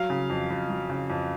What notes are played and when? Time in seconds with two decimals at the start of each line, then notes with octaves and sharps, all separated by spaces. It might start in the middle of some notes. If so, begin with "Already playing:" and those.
Already playing: F#3 F5
0.10 C#3
0.30 F2
0.50 F2
0.69 F#3
0.90 C#3
1.10 F2